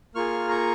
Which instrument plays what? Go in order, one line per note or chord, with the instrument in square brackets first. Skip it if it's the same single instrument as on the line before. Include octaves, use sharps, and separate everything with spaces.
[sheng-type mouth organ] A#3 F4 G#4 C#6 F6
A#5 C#6